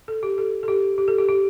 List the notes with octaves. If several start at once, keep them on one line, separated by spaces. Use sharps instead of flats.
A4
G4
A4
A4
G4
G4
A4
G4
G4